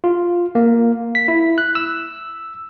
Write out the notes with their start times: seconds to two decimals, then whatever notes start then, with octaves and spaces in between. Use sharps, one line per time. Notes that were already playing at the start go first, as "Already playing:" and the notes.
0.04 F4
0.55 A#3
1.15 B6
1.28 E4
1.58 F#6
1.75 E6